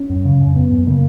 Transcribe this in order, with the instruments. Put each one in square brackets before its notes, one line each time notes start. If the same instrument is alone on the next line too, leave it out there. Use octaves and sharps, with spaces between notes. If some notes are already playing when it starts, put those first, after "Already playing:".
Already playing: [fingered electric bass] C#4
F#2
C#3
F#2
F#2 B3
F#2
C#3 A#3